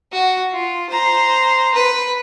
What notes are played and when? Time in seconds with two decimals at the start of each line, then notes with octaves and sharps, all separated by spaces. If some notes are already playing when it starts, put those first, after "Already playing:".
0.12 F#4
0.53 F4
0.90 C5 A#5
1.75 B4